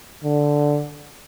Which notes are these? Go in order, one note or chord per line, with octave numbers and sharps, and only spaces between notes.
D3